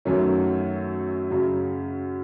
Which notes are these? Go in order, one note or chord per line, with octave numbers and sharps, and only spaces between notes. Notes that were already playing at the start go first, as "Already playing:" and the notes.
F#2 D#3 F#3 A3 C#4
F#2 C#3 F#3